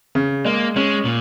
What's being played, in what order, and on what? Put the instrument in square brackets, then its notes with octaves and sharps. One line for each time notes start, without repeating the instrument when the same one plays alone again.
[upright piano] C#3
[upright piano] G#3 [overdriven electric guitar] A#3
[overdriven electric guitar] G#3 [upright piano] C#4
[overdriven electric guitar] A#2